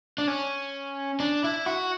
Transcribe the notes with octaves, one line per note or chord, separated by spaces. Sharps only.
D4
C#4
D4
E4
F#4